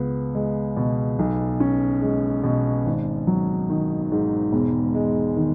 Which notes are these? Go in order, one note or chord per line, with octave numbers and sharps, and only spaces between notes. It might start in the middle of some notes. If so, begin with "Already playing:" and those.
Already playing: C#2 B3
G#3
B2
B1
C#4
G#3
B2
G#1
F#3
D#3
G#2
E1
G#3
D#3